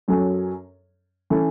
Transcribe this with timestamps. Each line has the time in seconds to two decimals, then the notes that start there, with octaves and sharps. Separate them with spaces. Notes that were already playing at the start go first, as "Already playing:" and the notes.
0.08 F#2 F#3 C#4 A4
1.30 E3 C#4 A4